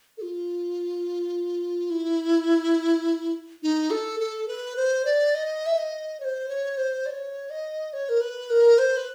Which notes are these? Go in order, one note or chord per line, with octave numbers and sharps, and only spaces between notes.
A4
F4
E4
D#4
A4
A4
B4
C5
D5
D#5
E5
D#5
C#5
C5
C#5
C5
D5
C#5
D#5
C#5
A#4
B4
A#4
C5
B4